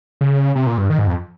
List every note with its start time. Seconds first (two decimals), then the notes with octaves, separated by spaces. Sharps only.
0.21 C#3
0.56 C3
0.67 A#2
0.78 G2
0.90 D#3
0.98 G#2
1.07 F2